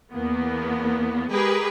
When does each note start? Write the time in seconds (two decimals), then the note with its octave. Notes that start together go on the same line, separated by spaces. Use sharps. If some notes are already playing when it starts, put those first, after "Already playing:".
0.12 E2 A#3 B3
1.31 G#3 G4 G#4 A#4 B4